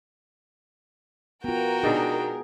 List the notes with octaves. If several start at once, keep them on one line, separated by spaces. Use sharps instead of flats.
B3 F4 F#4 A#4 G5
B2 D4 D#4 G#4